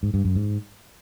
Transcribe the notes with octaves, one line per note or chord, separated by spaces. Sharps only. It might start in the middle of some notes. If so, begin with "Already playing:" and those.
G#2
G2
F#2
G#2